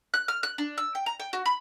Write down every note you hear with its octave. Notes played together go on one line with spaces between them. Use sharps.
F#6
F6
F#6
D4
E6
G5
A#5
G5
F#4
B5